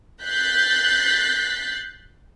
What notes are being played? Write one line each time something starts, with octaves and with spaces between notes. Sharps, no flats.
F#6 G6 A6 B6 C7